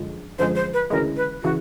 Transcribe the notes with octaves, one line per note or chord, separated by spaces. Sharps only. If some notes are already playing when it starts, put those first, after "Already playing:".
Already playing: F#2 D3 F3 G#3
F#2 D3 F3 G#3 C5
C5
B4
D2 C#3 E3 G#3 A#4
B4
C#3 E3 F#4